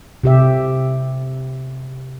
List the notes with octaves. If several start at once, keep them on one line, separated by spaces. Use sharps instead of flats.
C3 G4 E5